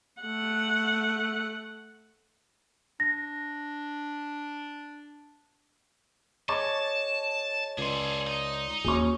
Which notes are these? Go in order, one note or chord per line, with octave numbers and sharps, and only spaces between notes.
A3 F#5
D4 A#6
G#4 C#5 D#5 A5 C#6 D6 A6
C#2 G#4 A4 D5 C6
D#4
D#2 C#4 F#4 G#4 C#6